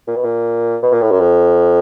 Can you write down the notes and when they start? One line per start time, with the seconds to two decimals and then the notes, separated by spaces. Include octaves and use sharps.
0.07 A#2
0.16 B2
0.24 A#2
0.83 B2
0.92 A#2
1.02 A2
1.11 F#2
1.20 F2